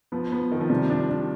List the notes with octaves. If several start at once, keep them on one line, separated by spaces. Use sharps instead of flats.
F3 B3
B3
D#3
F3
C3 G3
D4
D4